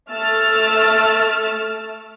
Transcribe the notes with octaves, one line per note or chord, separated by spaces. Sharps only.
A3 E6 F6 A6